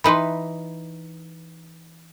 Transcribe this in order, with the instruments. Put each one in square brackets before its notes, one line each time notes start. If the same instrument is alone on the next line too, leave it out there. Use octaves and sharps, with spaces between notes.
[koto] E3 D#4 B4 [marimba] B5 C6